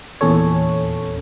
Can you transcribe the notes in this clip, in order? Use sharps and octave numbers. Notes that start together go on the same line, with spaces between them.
E2 A#2 C#4 A4 C#5